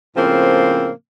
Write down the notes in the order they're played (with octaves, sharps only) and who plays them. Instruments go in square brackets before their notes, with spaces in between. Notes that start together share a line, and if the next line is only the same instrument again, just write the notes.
[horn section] A2 C#3 F3 A#3 C4